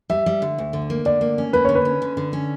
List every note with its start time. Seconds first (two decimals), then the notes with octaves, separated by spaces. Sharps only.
0.10 G3 E5
0.26 G3
0.42 D3
0.58 D2
0.73 D3
0.90 A#3
1.05 D3 D5
1.21 A#3
1.38 C#4
1.53 A#3 B4
1.65 D3 C#5
1.75 B4
1.85 C#4
2.02 D3
2.17 D3
2.33 C#4